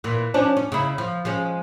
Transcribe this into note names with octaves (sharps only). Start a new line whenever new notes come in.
A#2 E3
F3 C#4 D4
C#4
C#3 D#4 E4
F3
F3 G#3 C#4